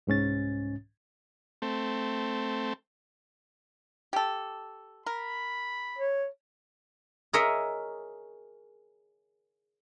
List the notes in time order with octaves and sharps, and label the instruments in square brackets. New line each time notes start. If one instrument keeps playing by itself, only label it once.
[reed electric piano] C2 G#2 C#4 A6
[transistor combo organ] A3 C4
[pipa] G4 A4
[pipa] A#4 [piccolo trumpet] B5
[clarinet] C#5
[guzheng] G#4 A#4 C#5 D#5 E5